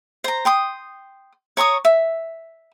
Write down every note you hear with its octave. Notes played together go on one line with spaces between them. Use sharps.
C5 A#5
G5 C6 D#6
C#5 A#5 C#6 D#6
E5